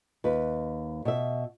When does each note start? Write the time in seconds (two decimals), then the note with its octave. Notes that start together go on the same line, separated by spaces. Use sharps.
0.24 D#2 B4
1.05 B2 E5